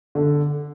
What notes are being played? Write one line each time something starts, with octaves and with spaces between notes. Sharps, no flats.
D3